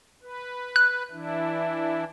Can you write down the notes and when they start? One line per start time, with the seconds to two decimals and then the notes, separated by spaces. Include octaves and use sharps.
0.22 B4
0.76 F#6
1.11 E3 D4 E4